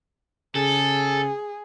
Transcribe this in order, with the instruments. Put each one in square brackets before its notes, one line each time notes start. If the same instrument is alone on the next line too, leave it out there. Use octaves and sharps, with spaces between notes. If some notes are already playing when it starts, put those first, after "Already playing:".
[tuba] C#3 [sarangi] G#4 [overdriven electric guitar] A4